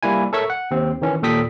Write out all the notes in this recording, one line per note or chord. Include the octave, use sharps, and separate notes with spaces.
G3 A#3 E4 G#5
A4 A#4 C#5 E5 C#6 E6
F#5
D#2 C4
D#3 E3 C#4
D#2 A#2 A4 G5 D#6 B6